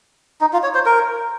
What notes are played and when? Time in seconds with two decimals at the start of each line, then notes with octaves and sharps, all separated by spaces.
0.41 D#4
0.53 F4
0.63 C#5
0.74 C5
0.86 A#4